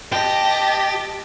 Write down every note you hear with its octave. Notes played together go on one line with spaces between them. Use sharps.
G4 D#5 A5